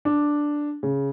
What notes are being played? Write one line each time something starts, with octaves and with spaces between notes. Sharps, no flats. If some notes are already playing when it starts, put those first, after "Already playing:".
D4
C#3